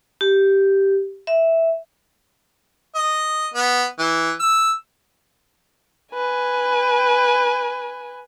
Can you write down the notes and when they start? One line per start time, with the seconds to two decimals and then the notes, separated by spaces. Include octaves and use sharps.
0.21 G4
1.27 E5
2.95 D#5
3.54 B3
3.99 E3
4.40 E6
6.14 B4 G#5